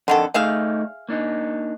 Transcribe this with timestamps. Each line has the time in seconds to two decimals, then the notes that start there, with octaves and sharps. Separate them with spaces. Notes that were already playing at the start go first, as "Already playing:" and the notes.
0.08 F2 D3 D#3 A4 F#5
0.34 A3 D#4 G#4 D5 E5 F5
1.09 A#3 D4 D#4